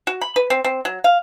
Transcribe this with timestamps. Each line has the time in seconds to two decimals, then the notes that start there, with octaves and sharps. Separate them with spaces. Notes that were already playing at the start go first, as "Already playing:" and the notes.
0.07 F#4
0.21 B5
0.36 B4
0.50 C4
0.64 C4
0.85 F#3
1.04 F5